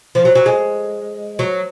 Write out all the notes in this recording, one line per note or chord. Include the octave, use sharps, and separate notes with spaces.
F3
F#3
F#3
G#3
F#3